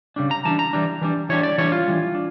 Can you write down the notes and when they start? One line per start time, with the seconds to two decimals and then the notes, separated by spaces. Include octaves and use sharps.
0.16 C#3 G3 D4
0.31 A#5
0.45 E3 G3 D4 A5
0.59 A#5
0.73 E3 G3 D4
1.02 E3 G3 D4
1.29 E3 G3 D4 C#5
1.43 D5
1.58 E3 G3 D4 C#5
1.72 F4
1.86 E3 G3 D4
2.15 D4